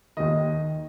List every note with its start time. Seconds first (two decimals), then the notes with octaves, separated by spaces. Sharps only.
0.17 D#2 D#3 D#5